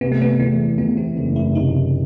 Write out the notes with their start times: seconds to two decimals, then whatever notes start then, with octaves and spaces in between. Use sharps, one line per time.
0.01 C3 B3
0.12 A3
0.22 B3
0.39 E2 A3
0.78 E2 B3
0.97 C4
1.17 F#1 C4
1.36 E4
1.55 C3 D#4